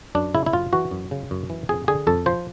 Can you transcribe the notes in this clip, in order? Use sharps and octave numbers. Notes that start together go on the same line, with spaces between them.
F#2 D4
C#3 E4
E4
F#2 F4
E3 F#4
F#2
C#3
F#2
E3
F2 G#4
D3 G#4
F2 A4
F3 C5